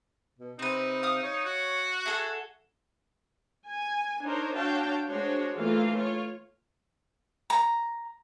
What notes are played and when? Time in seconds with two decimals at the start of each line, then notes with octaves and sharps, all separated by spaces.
0.39 B2
0.59 C3 C4 D#4 B4
1.03 F5 D#6
1.23 C#5
1.45 F#4
2.06 G#4 A4 E5 F#5
3.67 G#5
4.24 D4 D#4 A#4 C5 C#5
4.55 D4 F#4 C#5 F5 G5 A5
5.09 G#3 D4 F#4 C5 C#5
5.56 E3 A3 A#3 F4 F5
5.96 F4 C#5
7.50 A#5